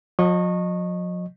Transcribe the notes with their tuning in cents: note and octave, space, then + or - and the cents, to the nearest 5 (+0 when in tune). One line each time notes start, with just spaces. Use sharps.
F3 +45 D#5 -20 C#6 -20